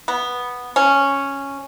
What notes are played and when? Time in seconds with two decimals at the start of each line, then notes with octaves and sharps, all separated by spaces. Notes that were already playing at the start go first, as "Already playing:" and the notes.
0.08 B3
0.76 C#4